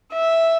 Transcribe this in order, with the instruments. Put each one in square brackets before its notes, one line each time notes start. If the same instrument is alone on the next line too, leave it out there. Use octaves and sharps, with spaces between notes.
[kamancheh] E5